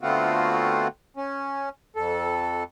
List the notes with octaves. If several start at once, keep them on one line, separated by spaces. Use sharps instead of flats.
D3 A3 B3 C4 F4 F#4
C#4
F2 A4